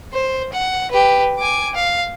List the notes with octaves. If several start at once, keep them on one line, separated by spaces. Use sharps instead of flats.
C5
F#5
G4 B4
G#5 D6
F5